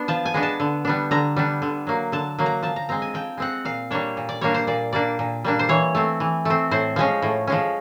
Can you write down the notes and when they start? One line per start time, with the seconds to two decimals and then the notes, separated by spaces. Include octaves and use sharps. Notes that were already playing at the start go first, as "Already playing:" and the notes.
Already playing: B3 D4
0.08 F3 A5
0.26 G#5
0.34 G#3 B3 D4
0.43 A5
0.60 D3
0.85 G3 B3 D4
1.11 D3 A#5
1.36 G3 B3 D4
1.62 D3
1.87 F#3 A#3
2.12 D3 A5
2.39 F#3 A#3
2.46 A#5
2.63 F3 A5
2.76 A#5
2.89 G#3 C4 A#5
3.02 G#5
3.14 F3 G5
3.37 G#3 C4 F#5
3.65 A#2 F5
3.91 G3 A#3 D4 C#5
4.17 A#2
4.29 D5
4.41 G3 A#3 D4 C#5
4.54 C5
4.67 A#2 D5
4.93 G3 A#3 D4 D5
5.19 A#2
5.44 G3 A#3 D4
5.59 C5
5.69 E3 C#5
5.95 A3 C4
6.20 E3
6.45 A3 C4
6.71 A2 C5
6.96 F3 G#3 C#4
7.22 A2
7.47 F3 G#3 C#4